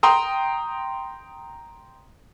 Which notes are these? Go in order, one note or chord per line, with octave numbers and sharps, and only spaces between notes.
G5 A#5 C6 D#6